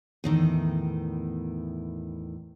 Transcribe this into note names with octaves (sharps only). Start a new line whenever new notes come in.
E2 A2 D#3